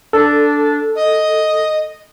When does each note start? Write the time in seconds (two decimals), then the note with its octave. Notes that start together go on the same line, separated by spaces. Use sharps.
0.13 D4 A4
0.96 D#5